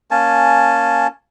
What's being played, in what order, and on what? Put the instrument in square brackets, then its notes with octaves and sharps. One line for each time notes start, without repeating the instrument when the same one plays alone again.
[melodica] A#3 C#4 G#5 A5